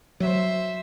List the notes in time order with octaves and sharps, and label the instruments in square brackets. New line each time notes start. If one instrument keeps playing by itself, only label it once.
[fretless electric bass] F#3 [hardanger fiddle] C5 E5